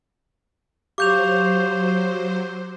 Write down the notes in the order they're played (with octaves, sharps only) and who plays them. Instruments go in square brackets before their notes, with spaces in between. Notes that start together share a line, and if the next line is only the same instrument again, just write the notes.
[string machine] F#3 C5 [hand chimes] G4 F5 C#6 [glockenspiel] D6 G6 F7